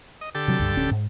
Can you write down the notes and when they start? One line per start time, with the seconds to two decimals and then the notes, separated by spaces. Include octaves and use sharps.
0.21 D#5
0.35 D3 G4 A4
0.48 C3 F#3
0.59 C#2 G2
0.76 D1 C#4
0.91 G#2